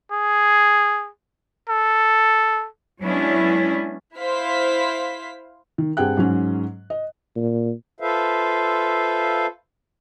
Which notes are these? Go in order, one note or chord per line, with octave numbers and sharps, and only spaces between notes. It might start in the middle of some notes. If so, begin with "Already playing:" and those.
G#4
A4
F#3 G#3 B3 C#4 D4 E4
E4 C5 F5 B6
D#3
G2 C4 G#4 F#5 G5 F#6
G#2 F#3 C#4
D#5
A#2
F4 A4 B4 C5 E5 F5